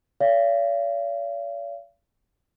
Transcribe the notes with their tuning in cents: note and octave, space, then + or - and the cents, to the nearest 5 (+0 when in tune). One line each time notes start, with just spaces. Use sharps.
D5 -45 F5 -40